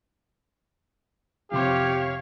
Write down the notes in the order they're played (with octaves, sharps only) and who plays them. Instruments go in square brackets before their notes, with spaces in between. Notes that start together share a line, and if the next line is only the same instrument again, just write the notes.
[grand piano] F2 C3 C6 [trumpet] G4 [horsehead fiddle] C#5 F5